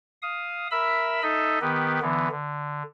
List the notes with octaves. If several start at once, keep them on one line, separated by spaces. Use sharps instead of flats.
F5 D#6
A#4 E5 B5 E6
D#4 A4 D#5 E5
D#3 B3 G4 B4
D3 E3 B3
D3